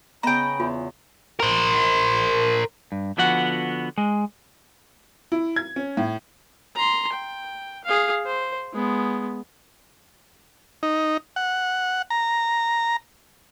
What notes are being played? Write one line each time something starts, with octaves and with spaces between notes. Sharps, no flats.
C#3 B3 D#5 G5 A#5 B5
E2 F4
A#4 C5
G2
D3 F3 B3 F#4 F#5
G#3
E4
G#6
C#4
A2
A#5 C6
G5
G#4 F5
C5
G#3 B3
D#4
F#5
A#5